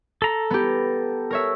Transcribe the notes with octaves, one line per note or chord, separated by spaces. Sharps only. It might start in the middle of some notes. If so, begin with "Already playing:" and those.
A4 A#5
B3 G4
A#4 C#5 E5